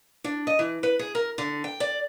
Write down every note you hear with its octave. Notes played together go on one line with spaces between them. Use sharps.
D4
D#5
E3
B4
G#4
A#4
D3
G5
D5